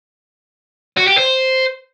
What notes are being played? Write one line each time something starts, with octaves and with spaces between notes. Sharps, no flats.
F#4
G4
C5